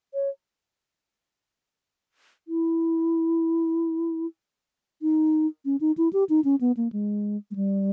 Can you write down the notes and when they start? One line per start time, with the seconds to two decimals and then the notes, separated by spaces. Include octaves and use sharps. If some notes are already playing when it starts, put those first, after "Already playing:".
0.14 C#5
2.48 E4
5.02 D#4
5.65 C#4
5.81 D#4
5.98 E4
6.13 G4
6.29 D#4
6.44 C#4
6.61 B3
6.77 A#3
6.92 G#3
7.51 G#3
7.56 G3